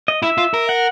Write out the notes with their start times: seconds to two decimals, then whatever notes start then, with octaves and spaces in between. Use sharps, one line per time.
0.08 D#5
0.23 E4 E5
0.38 F4
0.54 A#4
0.69 F#5